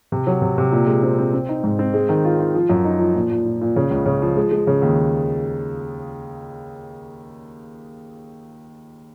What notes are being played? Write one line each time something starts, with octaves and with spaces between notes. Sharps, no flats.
C3
F#3
C3
C3
A#2
G#3
C4
C4
C4
D#4
G#2
C4
G#3
D#3
F4
F4
F3
F#2
D#4
F3
A#2
A#2
A#2
A#2
C#3
C#2
C#3
F3
G#3
G#3
C#3
D#2